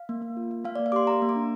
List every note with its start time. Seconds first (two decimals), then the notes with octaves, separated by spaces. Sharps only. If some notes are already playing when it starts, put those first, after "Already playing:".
Already playing: F5
0.09 A#3
0.22 A#3
0.37 F4
0.51 A#3
0.65 A#3 F5
0.76 A#3 D5
0.86 F5
0.92 G4 C6 D6
1.07 A#3 A#5
1.22 A#3
1.29 D6
1.36 D4